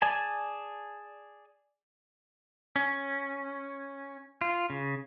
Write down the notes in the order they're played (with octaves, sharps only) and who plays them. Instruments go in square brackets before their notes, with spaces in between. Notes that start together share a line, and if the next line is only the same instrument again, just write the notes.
[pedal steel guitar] G#4 D5 G#5 A5
C#4
F4
C#3